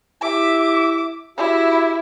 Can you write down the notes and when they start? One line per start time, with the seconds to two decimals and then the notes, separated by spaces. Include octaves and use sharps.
0.22 E4 G4 E5 D6
1.37 E4 F#4 G4 E5